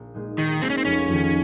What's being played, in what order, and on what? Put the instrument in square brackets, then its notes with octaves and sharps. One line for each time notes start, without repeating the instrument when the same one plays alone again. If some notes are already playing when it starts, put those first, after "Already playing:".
Already playing: [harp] A#1
A#2 G#3 D#4
[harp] A#1 [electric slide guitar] D#3
[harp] A#2 G#3 D#4 [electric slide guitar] C4
[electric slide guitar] C#4
C4
[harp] F1 [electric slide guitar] C#4
[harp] F2 D#3